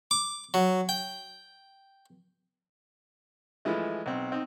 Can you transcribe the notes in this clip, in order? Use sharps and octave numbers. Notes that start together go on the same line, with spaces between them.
D6
F#3
G5
E3 F3 G#3 A3
B1 C4
C4 D#4